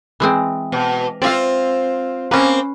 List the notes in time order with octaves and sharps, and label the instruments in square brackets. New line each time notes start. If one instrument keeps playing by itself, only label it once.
[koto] E3 G#3 C4
[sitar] B2
[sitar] C4 F4 [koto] D5 E5 F5
[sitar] A#3 C4 [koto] C#4 B4